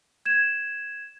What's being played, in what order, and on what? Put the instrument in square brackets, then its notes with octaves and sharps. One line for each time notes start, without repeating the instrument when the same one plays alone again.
[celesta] G#6 E7